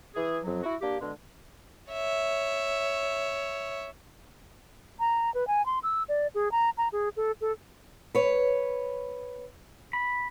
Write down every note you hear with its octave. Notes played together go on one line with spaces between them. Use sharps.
E3 G#4
F2 F#3
E4 F#4
A#3 D4 G4
B2 D3 G#3
C#5 E5
A#5
B4
G#5
C6
E6
D5
G#4
A#5
A#5
G#4
A4
A4
B4 C#5
B5